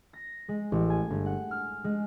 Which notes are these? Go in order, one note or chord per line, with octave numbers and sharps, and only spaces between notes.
A#6
G#3
A1
G#5
G1
F#5
F6
G#3